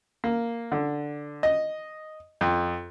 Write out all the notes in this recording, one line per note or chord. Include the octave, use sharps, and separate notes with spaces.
A#3
D3
D#5
F2